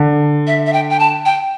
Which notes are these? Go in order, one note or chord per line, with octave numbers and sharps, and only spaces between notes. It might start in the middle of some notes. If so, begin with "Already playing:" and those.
Already playing: D3
E5
E5
G5
G5
A5
G5